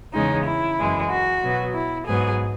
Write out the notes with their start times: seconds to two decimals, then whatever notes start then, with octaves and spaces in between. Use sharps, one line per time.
0.13 E2 C#3 G#3 C#4 D#4
0.46 E4
0.78 F#2 E3 G#3
1.11 F#4
1.43 B2 F#3 B3
1.75 E4
2.07 G#2 F#3 B3 G#4